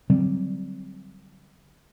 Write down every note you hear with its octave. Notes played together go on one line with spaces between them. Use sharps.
D3 F#3 G3 C4